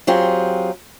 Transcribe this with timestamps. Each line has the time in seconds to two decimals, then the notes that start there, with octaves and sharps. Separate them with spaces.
0.07 F#3 C4 F4 G4 G#4